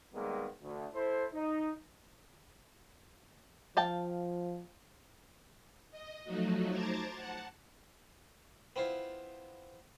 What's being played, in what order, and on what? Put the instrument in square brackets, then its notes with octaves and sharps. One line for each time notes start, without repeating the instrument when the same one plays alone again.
[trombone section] D#3 G3 G#3 A#3 B3
D2
E4 A4 C5
D#4
[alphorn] F3 [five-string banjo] F5 G5 A5
[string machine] D#5
F3 F#3 A3 D#4 F#4
C5 A5 A#5 D6 G#6 A6
F#5 A5
[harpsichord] B3 C4 E4 F4 C5